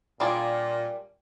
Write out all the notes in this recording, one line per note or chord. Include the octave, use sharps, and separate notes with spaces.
A#2 G3 D4 F4 G#4 D5